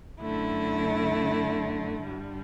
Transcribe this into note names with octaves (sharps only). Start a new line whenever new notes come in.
F#2 D3 A3 E4
G2 D3 G3